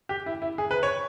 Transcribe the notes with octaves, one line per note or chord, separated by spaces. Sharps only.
G4
E4
E4
G#4
B4
C#5